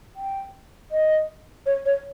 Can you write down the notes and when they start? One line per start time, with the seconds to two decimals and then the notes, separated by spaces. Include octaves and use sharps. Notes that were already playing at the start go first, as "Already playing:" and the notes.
0.16 G5
0.91 D#5
1.66 C#5
1.85 C#5